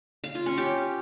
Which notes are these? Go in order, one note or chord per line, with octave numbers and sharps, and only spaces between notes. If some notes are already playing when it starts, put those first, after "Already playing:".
F5
F4
C#4
G4